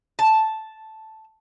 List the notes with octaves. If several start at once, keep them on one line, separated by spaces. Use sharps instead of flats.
A5